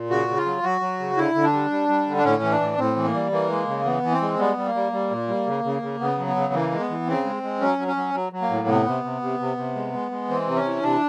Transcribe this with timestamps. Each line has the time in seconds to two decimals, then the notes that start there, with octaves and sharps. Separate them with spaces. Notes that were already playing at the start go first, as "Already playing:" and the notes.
Already playing: A#2
0.10 C#3 F#4
0.28 C#3
0.37 F4
0.46 F#3
0.63 F#3 F#4
0.81 F#3
1.00 C#3
1.17 D3 E4
1.35 D3
1.44 D4
1.53 G3
1.71 G3
1.89 G3
2.07 D3
2.17 D4
2.24 A2 C#4
2.42 E3
2.51 D4
2.60 A2
2.78 A2 C4
2.96 E3
3.05 A#3
3.14 G3
3.32 E3 A#3
3.50 G#3
3.67 C#3
3.85 E3 B3
4.03 E3
4.12 C4
4.22 G#3
4.39 G3 B3
4.57 G3
4.66 A#3
4.75 G3
4.92 G3
5.10 A#2
5.28 G3
5.46 C#3
5.64 C#3
5.82 C#3
6.00 C#3 B3
6.18 F#3
6.27 B3
6.36 C#3
6.53 E3 A#3
6.71 G#3
6.80 B3
6.90 E3
7.07 C#3 C4
7.25 G#3
7.43 G#3
7.60 F#3 C#4
7.78 F#3
7.88 C#4
7.96 F#3
8.14 F#3
8.32 F#3
8.42 A#3
8.50 A2
8.68 C3 B3
8.86 C3
9.04 C3
9.22 C3
9.39 C3
9.57 C3
9.75 G#3
9.93 G#3
10.11 G#3
10.29 E3 C4
10.47 C3
10.56 C#4
10.65 E3
10.83 C3 D4